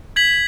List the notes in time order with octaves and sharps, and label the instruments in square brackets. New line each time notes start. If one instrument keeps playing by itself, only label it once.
[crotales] G#6 B6 F#7